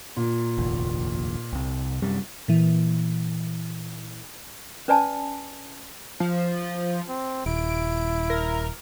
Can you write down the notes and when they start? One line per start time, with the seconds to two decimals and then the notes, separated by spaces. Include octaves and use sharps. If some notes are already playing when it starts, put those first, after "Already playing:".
0.17 A#2
0.58 F1 A#1 D#2
1.53 C2 C3
2.02 F#2 C3 G3
2.48 A#2 E3
4.88 C#4 B4 D5 G#5 A5
6.20 F3
7.09 C4
7.46 D#1 E4 D7
8.30 A#4